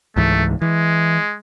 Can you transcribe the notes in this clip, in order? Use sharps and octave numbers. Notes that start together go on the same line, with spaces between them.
C#2 G#2 E3 A3
E3 G#3